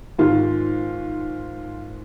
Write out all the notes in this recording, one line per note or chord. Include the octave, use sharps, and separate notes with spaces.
G#2 D#3 F4